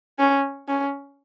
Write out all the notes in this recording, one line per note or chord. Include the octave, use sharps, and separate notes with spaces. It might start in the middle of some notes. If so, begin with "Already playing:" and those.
C#4
C#4